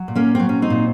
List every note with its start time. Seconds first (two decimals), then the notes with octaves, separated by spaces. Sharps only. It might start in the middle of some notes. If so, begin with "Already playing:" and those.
Already playing: F#3
0.08 A#2
0.15 A#3 C#4
0.35 F#3 C4
0.49 C#4
0.62 C4 D#4
0.70 A#2